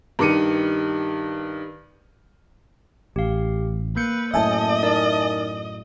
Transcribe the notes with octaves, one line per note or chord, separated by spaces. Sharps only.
G2 D#3 D6 C#7 D#7
A1 G4 F5
A#3 B4 G6 C#7
F#2 A2 D#5 E5 G#5 A5
D#4 A#4 D5